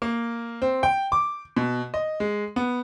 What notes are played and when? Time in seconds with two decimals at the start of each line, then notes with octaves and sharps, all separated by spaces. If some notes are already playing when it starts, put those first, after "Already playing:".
0.02 A#3
0.62 C4
0.83 G5
1.12 D6
1.57 B2
1.94 D#5
2.20 G#3
2.56 B3